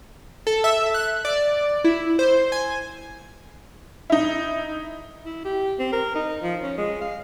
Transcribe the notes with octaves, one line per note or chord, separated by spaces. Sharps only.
A4
E5
F#6
D5
E4
C5
G#5
D#4 E4
E4
G4
C4
A#4
D#4
F3
C#4
G#3
F5